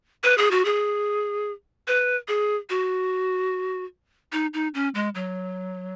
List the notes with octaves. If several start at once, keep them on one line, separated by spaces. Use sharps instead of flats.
B4
G#4
F#4
G#4
B4
G#4
F#4
D#4
D#4
C#4
G#3
F#3